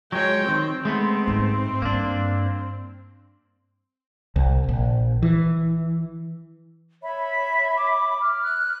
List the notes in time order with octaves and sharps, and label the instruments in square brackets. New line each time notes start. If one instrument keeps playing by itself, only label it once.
[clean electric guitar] F#3 G#3 [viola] C#5 G5
[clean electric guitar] D#3 [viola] C4
[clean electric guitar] G#3 A3 B3
[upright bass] G#2
[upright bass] G2 [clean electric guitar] A#3 D4
[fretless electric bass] C2
A#1
E3
[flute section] C#5 E5 B5
[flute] B6
D6
[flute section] F6
[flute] F#6